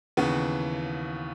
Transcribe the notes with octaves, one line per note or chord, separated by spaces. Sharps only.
D#2 C#3 E3 B3